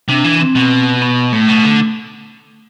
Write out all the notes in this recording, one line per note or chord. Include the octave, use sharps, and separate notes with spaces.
C3 D4
E3
C4
B2
B3
A2 A3
B2
D3